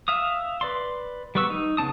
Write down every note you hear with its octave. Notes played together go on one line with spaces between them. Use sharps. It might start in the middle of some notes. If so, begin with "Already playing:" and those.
E5 F5 D#6
B4 D5 C6
G3 B3 B4 C#6 E6
D#4
C#3 B3 D4 A5 D#6